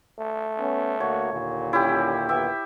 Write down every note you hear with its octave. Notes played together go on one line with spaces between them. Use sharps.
A3
B3 C#4
D2 A#3 F#4 C#5
D#2 A#2 D3
C#4 E4 G4
B3 G4 E5